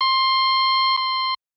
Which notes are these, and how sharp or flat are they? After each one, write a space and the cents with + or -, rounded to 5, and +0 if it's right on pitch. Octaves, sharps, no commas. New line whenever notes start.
C6 +15
C6 +0